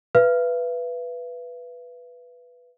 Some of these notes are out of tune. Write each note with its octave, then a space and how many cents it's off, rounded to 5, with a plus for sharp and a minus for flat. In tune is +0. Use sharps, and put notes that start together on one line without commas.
B4 +0 E5 +45